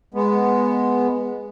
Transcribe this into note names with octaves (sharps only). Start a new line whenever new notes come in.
G#3 B3